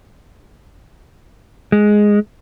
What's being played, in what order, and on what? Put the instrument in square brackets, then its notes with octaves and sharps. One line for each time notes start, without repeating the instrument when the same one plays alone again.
[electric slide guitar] G#3